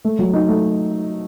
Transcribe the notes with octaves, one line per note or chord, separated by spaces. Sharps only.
A3
F#3
D#4
A3